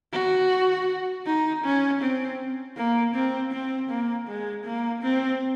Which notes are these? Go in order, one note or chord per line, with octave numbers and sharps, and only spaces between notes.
F#4
D#4
C#4
C4
A#3
C4
C4
A#3
G#3
A#3
C4